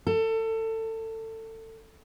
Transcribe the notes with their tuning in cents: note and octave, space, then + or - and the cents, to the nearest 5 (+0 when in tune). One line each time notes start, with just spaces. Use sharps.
A4 +25